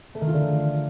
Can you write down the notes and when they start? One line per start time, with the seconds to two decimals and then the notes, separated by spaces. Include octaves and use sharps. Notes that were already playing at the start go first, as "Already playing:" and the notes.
0.15 A3
0.21 D#3
0.27 F4
0.34 D3